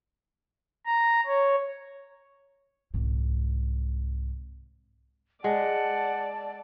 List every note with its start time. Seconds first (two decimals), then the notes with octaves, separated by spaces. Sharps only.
0.86 A#5
1.26 C#5
2.94 C2 G#2
5.44 G#3 D5 F#5 A5